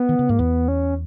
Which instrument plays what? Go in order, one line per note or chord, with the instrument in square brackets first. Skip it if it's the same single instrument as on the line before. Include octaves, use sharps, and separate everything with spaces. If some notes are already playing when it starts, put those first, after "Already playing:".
Already playing: [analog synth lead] B3
[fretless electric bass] D#3
C#3
[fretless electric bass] G#2 [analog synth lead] A#3
[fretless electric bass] E2 [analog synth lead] B3
[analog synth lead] C#4